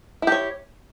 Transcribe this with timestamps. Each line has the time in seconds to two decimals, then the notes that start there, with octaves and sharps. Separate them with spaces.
0.22 E4
0.27 G4
0.32 C#5